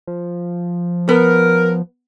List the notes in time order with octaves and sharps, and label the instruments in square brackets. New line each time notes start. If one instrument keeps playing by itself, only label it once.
[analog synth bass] F3
[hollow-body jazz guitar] B3 [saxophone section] A#4